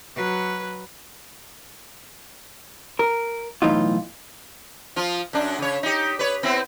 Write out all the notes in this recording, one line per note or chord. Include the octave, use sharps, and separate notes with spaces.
F#3 B4
A#4
B1 A2 E3 D#4 F4
F3 F4
F#2 D4
C#3 C#5
D#4 G4
B4 C#5
B3 C4 E4